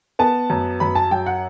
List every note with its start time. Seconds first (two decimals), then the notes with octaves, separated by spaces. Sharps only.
0.19 B3 A5
0.50 F#2
0.80 F#2 B5
0.95 A5
1.11 F#3 G5
1.26 F#5